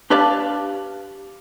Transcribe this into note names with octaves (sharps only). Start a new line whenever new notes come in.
D4 G4 B4 D5 F5 A5